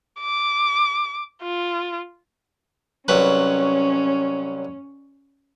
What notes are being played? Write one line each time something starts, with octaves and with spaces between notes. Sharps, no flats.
D6
F4
C2 F#3 C#4 B4